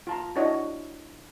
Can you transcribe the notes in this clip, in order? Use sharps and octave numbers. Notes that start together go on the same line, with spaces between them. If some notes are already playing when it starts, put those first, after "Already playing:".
F4 A5 A#5
D4 E4 F#4 C#5 D#5